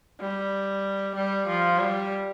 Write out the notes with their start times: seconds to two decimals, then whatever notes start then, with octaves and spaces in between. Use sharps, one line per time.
0.21 G3
1.15 G3
1.47 F3
1.79 G3